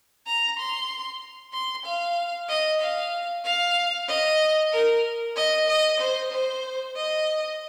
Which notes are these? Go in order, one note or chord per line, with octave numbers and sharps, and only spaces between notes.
A#5
C6
C6
F5
D#5
F5
F5
D#5
A#4
D#5
D#5
C5
C5
D#5